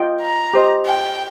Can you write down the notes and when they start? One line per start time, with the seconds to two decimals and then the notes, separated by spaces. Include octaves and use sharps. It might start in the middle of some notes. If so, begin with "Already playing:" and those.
Already playing: F4 D#5 G5
0.22 A#5
0.54 G4 C5 D#5
0.86 G5